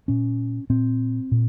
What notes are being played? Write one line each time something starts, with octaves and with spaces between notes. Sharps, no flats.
A#2 C#4
A#2 C4
A#2